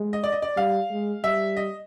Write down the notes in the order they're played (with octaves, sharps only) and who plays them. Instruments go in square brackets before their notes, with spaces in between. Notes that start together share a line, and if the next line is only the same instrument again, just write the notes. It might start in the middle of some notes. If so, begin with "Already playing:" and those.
Already playing: [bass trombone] G#3
[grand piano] D#5
D5
D#5
D5
[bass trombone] G3 [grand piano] F5
[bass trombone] G#3
[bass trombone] G3 [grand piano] E5
[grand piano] D#5